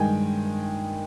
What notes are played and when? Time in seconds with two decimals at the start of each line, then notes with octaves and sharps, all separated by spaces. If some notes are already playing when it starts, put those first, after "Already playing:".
Already playing: G2 D#3 G#3 G5 G#5